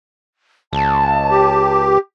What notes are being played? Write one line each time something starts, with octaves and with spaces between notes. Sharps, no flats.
C#2 A5
G4